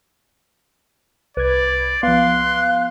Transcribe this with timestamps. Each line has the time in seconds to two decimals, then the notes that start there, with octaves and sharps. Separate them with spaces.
1.37 C2 B4 D5 G#6
2.03 F3 B3 F5 C6 F#6